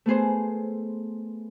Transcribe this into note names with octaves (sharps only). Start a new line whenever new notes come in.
A3 B3 G#4 C5